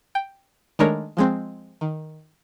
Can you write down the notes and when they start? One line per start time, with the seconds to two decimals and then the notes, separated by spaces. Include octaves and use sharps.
0.15 G5
0.79 D#3 G#3 A3 D4 A#4 C#5
1.17 F3 G#3 C4
1.81 D#3